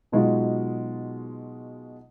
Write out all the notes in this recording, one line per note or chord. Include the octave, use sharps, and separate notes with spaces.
B2 F#3 G#3 D#4 F4 F#4